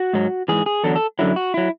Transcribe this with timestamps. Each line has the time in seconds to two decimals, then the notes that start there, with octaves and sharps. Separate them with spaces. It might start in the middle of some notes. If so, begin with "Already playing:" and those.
Already playing: F#4
0.13 G#2 F#3
0.48 G#2 E3 G#4
0.66 G#4
0.84 E2 D3 F#3 A4
0.95 A4
1.19 F#2 D3 F#3 E4
1.36 F#4
1.54 F#3 E4